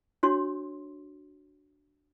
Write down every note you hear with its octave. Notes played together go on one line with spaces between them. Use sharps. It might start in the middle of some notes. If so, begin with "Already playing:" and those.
D4 F#4 C#5 C6